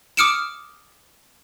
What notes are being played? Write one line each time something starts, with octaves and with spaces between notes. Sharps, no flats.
D6 D#6 F6 C#7 D7 E7